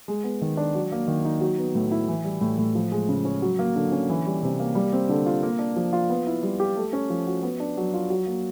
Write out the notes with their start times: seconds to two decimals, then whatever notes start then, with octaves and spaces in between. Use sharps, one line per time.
0.08 G#3
0.24 B3
0.42 D#3
0.57 D4
0.75 F#3
0.92 A#3
1.08 D#3
1.25 D#4
1.41 F#3
1.59 B3
1.75 A2
1.91 E4
2.08 E3
2.25 G3
2.41 A2
2.58 A2
2.75 F3
2.92 G#3
3.09 C#3
3.25 C#4
3.42 F#3
3.59 A#3
3.76 D3
3.92 C#4
4.10 E3
4.26 G3
4.43 C3
4.60 A#3
4.75 G3
4.93 C4
5.09 D3
5.26 F4
5.43 A#3
5.59 D4
5.76 F3
5.93 F4
6.10 B3
6.27 E4
6.43 G3
6.60 G4
6.76 A3
6.93 C#4
7.10 F3
7.27 F#4
7.43 B3
7.60 D4
7.77 F#3
7.94 F4
8.10 F#3
8.26 A#3